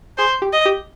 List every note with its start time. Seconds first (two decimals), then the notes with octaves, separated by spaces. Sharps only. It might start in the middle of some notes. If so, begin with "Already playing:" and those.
0.18 G#4 C5
0.42 G4
0.53 D#5
0.66 G4